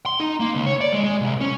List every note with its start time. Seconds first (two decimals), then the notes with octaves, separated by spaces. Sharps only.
0.06 C6
0.20 D#4
0.40 A#3
0.54 C#2
0.66 C#5
0.81 D5
0.93 G#3
1.04 G#3
1.21 C2
1.41 C#4